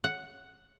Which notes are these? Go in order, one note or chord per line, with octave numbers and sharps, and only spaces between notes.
F#5